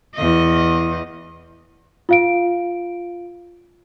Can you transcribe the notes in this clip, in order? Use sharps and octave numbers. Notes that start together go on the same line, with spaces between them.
E2 D#5
F4 F5 D7